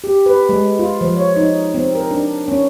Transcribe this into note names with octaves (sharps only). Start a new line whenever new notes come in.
G4
B4
G#3
F4
F3
C#5
D#4
C4
A#4
D4
C#4